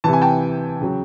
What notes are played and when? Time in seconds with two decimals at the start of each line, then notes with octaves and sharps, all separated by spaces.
0.04 C3 E3 A5
0.13 G#5
0.21 G5 A5
0.81 C#3 F#3